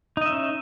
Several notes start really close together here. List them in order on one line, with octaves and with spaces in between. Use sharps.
D#4 D#5 E5 C#4